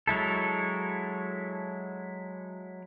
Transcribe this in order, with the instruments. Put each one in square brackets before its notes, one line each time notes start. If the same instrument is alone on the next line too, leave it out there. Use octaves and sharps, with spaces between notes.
[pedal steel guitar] F#3 G#3 E4 A4